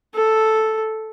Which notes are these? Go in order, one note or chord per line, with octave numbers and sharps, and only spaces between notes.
A4